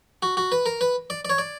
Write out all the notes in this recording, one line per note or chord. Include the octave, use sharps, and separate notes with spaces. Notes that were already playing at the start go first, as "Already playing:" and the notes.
F#4
F#4
B4
A#4
B4
D5
D5
C#5
D5